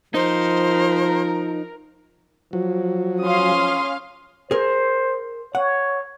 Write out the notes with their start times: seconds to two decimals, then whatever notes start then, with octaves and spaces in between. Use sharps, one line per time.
0.14 F3 D#4 A#4 C5
2.53 F3 F#3
3.22 C#4 F5 C6 D#6
4.51 G#4 A#4 C5
5.55 C#5 F#5